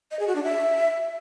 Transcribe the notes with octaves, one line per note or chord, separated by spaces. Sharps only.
D#5
G#4
F#4
D4
E5